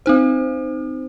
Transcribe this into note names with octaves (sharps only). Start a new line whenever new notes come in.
C4 D#4 C5